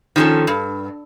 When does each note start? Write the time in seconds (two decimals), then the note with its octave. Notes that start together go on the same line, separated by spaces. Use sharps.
0.16 D#3 F3 F#3 C#4 A4
0.47 G2